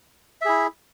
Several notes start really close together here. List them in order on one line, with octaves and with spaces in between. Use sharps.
E5 G#4 E4